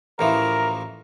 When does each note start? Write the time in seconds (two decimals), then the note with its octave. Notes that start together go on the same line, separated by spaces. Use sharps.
0.19 A1 E3 F3 A#4